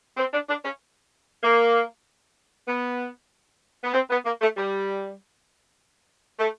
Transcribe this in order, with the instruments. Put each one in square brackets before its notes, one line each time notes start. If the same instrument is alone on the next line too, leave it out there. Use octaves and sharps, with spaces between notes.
[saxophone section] C4
D4
D4
C#4
A#3
B3
B3
C4
B3
A#3
A3
G3
A3